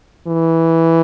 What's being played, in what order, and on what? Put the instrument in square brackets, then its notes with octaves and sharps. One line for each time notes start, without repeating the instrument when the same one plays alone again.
[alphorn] E3